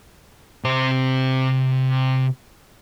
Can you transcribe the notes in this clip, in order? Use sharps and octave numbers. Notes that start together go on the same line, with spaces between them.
C3 C5